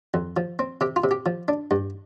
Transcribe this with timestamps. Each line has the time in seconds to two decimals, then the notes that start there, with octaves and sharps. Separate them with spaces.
0.14 F2
0.37 F3
0.59 C4
0.81 C3 G4
0.96 F4
1.04 C3
1.11 G4
1.26 F3
1.48 D4
1.71 G2